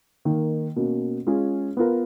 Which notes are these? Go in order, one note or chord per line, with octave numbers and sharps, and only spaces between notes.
D#3 A#3 D#4
B2 A#3 C#4
G#3 C#4 F4 G#4
B3 F4 A#4